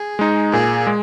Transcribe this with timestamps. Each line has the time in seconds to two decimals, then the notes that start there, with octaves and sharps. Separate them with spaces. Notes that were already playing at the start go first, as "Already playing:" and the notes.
Already playing: G#4
0.19 G#3 D#4
0.52 A#2 G#4
0.87 G#3